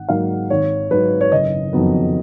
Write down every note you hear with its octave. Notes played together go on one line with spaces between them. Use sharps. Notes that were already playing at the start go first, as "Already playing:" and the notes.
Already playing: G#1 F#5
G#2 F#3 A#3 F5
G#1 C#5
G#2 F#3 B4
C#5
F#1 D#5
F2 D#3 F#3 B3